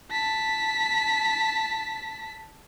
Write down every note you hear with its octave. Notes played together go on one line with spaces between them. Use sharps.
A5 B6